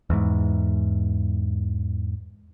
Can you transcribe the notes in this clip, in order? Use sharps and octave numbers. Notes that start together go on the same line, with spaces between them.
E2 G#2